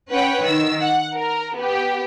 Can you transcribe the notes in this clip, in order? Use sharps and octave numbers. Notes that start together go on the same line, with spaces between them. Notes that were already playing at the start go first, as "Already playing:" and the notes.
C#4 B4 C#5 F#5 G5
D#3 E6
F#5
A#4
B3 G4